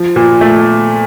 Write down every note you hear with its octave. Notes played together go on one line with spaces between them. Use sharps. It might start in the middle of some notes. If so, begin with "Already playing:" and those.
Already playing: F3
A#2
A3